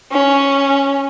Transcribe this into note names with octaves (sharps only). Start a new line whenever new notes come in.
C#4